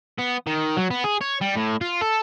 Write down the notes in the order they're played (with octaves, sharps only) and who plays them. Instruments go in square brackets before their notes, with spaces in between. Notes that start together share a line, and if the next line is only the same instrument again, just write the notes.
[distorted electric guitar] B3
D#3
F#3
B3
G#4
C#5
G3
A2
F4
A4